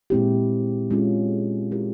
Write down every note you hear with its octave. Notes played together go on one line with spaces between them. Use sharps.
A#2 G#3 C4 E4 G4
G#3 C#4 F4 G#4
G#3 E4 G4 A#4